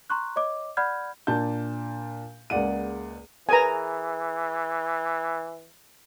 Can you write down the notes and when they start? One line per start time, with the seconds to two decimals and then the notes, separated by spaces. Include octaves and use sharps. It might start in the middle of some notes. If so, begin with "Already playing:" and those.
0.10 A#5 C6 C#6 F#6
0.36 C#5 D#5 D6
0.77 D5 F#5 B5 F6 G6 G#6
1.27 A#2 D4 A5 G6
2.50 C#2 A#3 G#4 D5 F#5 D#7
3.49 E3 G#4 A#4 B4 G#5 A#5